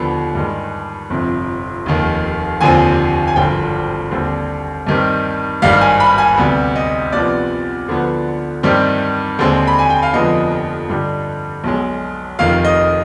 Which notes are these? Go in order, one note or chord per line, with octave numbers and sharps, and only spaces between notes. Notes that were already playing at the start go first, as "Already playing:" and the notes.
Already playing: D#2 D3 F3 B3 B5
G2 D#3 G#3
G1 F2 C3
F1 D#2 D#3
F1 D#2 D3 F3 C4 G#5
G#5
G#1 G2 D3 F3 G5
D#2 D3 G3 C4
G2 D#3 G3 C4
G#1 G2 D#3 G3 F5
G#5
B5
G#5
D2 C3 G3 B3
D#5
C2 C3 F3 B3 D5
D2 D3 F3 B3
G2 D#3 G3 C4
D#2 D3 G#3 C4
B5
G#5
G5
F5
F1 F2 D3 G#3 B3 D#5
G2 D3 G3
B1 B2 G#3
F1 F2 D#3 F5
D#5